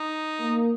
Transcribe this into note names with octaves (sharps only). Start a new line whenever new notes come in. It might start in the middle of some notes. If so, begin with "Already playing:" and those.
Already playing: D#4
A#3